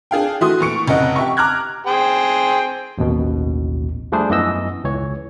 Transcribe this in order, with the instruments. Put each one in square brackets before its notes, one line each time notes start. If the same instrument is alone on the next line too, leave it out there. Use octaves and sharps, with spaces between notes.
[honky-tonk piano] D4 G#4 F5 G5
E3 A3 F#4 C6 D#6
A#2 E3 C#6 C#7 D7
F1 C#3 D#5 F#5
G4 E5 C#6
A#5 D6 F6 F#6 G#6
[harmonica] G#4 C5 G5
[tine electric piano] A1 D#2 B2
F3 G3 A3 D4 G#4 C5
F#2 E3 B3 D#5 E6
C#2 E3 C#5